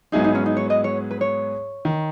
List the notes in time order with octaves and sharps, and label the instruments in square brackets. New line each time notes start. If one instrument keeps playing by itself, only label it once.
[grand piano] G#2 F#3 B3 E4 G#4 [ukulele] D#4
[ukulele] D#4
C#4
D#4
C#5
D#5
C#5
B4
C#5
[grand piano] D#3